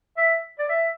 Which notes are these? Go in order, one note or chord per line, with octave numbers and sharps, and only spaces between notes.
E5
D5
E5